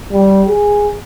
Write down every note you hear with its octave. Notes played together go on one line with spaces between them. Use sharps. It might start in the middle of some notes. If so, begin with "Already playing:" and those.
G3
G#4